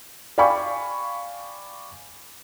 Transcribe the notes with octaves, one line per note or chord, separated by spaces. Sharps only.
D5 F5 G5 G#5 B5 C#6